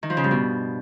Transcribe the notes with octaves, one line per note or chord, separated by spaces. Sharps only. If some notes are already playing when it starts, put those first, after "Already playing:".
D#3
F3
C#3
G2
B2